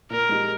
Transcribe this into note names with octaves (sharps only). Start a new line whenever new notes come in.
A#2 A#4
G#3 D#4 G4